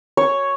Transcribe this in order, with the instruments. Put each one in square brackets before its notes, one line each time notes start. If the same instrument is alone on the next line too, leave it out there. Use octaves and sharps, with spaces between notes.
[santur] C#5